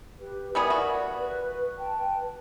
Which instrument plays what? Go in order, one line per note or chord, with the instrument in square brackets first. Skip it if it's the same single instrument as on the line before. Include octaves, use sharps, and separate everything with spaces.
[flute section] G4 B4
[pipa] G3 B3 G#4 [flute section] A#4 D5 E5
[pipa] F#4
[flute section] B4
B4 G5 A5